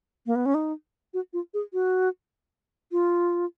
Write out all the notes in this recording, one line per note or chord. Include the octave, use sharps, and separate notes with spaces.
A#3
B3
C#4
D#4
F#4
F4
G#4
F#4
F4